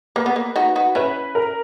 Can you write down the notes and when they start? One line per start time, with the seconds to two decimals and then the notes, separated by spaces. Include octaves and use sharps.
0.16 A#3 B4
0.26 B3
0.36 A#3
0.56 D#4 F#4
0.76 D#4 F#4
0.95 C#4 E4 B4
1.35 A#4